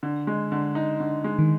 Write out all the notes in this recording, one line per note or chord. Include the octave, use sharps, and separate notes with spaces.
D3
G#3
D3
D#4
D3
G#3
D#3